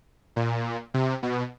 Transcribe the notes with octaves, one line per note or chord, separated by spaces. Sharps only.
A#2
C3
B2